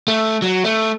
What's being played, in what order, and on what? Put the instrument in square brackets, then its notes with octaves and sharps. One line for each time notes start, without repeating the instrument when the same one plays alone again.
[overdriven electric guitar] A3
F#3
A3